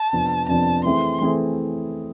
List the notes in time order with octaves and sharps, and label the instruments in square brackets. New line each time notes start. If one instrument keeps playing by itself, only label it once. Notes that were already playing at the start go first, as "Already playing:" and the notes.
Already playing: [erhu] A5
[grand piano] F2 C3 F3 B3 D4
[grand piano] F2 C3 F3 B3 D4 [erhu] A5
[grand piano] E3 A3 C4 E4 G#4 [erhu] C6
[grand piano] E3 A3 C4 E4 G#4